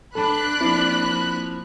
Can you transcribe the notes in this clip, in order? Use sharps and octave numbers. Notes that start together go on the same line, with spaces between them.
D4 A4 A5 B5 F#6
F3 A#3 C4 E4